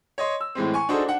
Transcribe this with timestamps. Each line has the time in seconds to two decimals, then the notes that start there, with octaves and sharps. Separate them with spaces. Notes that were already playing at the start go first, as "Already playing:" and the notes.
0.18 C#5 D#5 C6
0.41 E6
0.55 A2 E3 G#3 C4
0.74 G#5 C#6
0.89 D4 D#4 F#4 G#4 A4 C5
1.05 D4 F#5